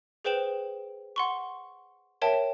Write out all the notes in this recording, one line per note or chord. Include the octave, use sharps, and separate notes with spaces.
G#4 B4 C5 G5 E7 F#7
F#5 C6 C#6
A#4 C#5 E5 G5 A5